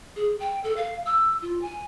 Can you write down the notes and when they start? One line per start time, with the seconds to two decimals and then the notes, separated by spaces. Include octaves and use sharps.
0.16 G#4
0.40 G5
0.64 A4
0.77 F5
1.06 E6
1.42 F4
1.62 G#5